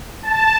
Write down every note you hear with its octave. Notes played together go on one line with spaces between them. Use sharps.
A5